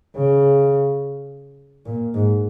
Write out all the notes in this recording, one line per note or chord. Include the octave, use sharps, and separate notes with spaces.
C#3
A#2
G#2